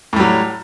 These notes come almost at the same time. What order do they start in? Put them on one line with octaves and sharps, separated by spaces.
A2 G3 F#3